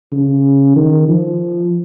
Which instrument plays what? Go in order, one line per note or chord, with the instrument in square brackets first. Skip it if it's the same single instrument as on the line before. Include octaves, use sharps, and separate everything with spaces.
[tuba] C#3
D#3
F3